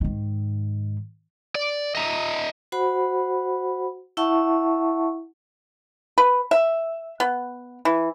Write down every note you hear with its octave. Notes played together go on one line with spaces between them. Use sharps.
G#2 D#3
D5
D#5 E5 A#5
F#4 C5 F#5 B5
E4 E5 F#5 A5 C#6
B4
E5
B3
E3